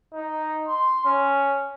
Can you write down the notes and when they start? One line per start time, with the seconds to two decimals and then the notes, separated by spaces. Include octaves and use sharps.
0.13 D#4
0.67 C6
1.05 C#4